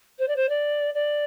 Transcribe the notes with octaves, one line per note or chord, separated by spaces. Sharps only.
C5
D5
C5
D5
D5